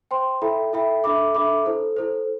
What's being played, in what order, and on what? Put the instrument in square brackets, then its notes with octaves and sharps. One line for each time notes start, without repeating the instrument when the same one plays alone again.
[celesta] C5 G5 C6
E4 A4 E5 G5 B5
E4 A4 E5 G5 B5
D4 A4 E5 B5 D6
D4 A4 E5 B5 D6
E4 A4 C5
E4 A4 C5